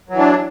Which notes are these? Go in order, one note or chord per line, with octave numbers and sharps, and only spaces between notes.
E3 F#3 D4